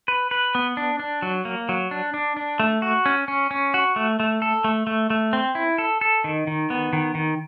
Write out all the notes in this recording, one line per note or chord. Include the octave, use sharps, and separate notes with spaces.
B4
B4
B3
D4
D4
F#3
A#3
F#3
D4
D4
D4
A3
F#4
C#4
C#4
C#4
F#4
A3
A3
A4
A3
A3
A3
C4
E4
A4
A4
D#3
D#3
B3
D#3
D#3